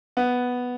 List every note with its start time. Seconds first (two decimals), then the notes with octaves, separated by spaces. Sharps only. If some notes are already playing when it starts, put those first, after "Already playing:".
0.17 B3